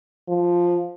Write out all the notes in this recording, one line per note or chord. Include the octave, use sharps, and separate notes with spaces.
F3